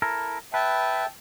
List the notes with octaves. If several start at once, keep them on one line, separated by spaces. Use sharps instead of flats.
E4 A4 A#4
B4 E5 G5 A5